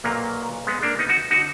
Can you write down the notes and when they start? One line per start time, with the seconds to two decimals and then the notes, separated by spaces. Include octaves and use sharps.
0.04 B1 A#2 F#3 A#3
0.67 G#3 B3
0.83 A#3 D4
0.99 B3 D#4
1.09 D#4 F#4
1.31 D3 D#4 F#4